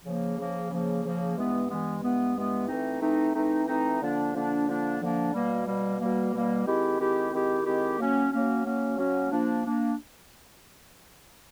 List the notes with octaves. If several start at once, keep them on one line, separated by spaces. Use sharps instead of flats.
C#3 F3 A#3
C#3 F3 A#3
C#3 F3 A#3
C#3 F3 A#3
G2 E3 G#3 B3
G2 E3 G#3 B3
G2 E3 G#3 B3
G2 E3 G#3 B3
E3 A3 C4 D#4
E3 A3 C4 D#4
E3 A3 C4 D#4
E3 A3 C4 D#4
D3 F3 A#3 D4
D3 F3 A#3 D4
D3 F3 A#3 D4
D3 F3 A#3 D4
B2 G3 A#3
B2 G3 A#3
B2 G3 A#3
B2 G3 A#3
D#3 G#3 C4 E4 G4
D#3 G#3 C4 E4 G4
D#3 G#3 C4 E4 G4
D#3 G#3 C4 E4 G4
F#3 A#3 C#4
F#3 A#3 C#4
F#3 A#3 C#4
F#3 A#3 C#4
F3 A#3 D4
A#3 D4